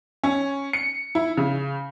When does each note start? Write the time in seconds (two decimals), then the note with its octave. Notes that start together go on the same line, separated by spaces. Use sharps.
0.23 C#4
0.73 C#7
1.15 E4
1.37 C#3